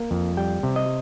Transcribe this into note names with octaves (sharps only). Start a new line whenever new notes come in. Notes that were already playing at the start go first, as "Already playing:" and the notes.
Already playing: A#3
F2
G3 G5
C3
D#5